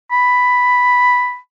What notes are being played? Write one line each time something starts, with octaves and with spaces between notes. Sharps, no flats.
B5